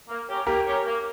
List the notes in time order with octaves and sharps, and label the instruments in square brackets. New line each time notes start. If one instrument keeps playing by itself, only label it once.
[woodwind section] A#3
C#4 G4 A#4 C#5
[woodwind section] A#3 [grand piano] G4 A#4
[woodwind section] C#4 G4 A#4 C#5
A#3